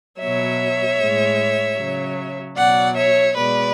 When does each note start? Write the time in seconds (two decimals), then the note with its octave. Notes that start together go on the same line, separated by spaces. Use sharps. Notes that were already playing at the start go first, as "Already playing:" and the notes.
0.20 B2 F#3 C#5 E5
1.00 A2 G#3
1.79 C#3 F#3
2.57 B2 F#3 D5 F#5
2.97 C#5 E5
3.36 B2 G#3 B4 D5